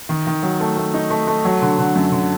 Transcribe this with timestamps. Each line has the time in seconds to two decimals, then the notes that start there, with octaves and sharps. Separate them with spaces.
0.09 D#3
0.27 D#3
0.43 F#3
0.60 A3
0.77 A3
0.94 D#4
1.10 A3
1.27 A3
1.45 F#3
1.62 D3
1.78 D3
1.95 F#2
2.12 D3